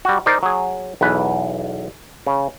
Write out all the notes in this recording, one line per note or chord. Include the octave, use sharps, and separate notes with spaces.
G3 F#4
D#4 A#4 C5 D5
F#3 G#4
B1 E2 B4
C#3